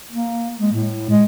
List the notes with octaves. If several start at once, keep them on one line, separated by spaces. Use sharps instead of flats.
A#3
G#3
A2
G#3